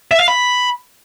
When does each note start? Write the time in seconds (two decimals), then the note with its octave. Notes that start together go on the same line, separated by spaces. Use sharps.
0.11 E5
0.20 F5
0.28 B5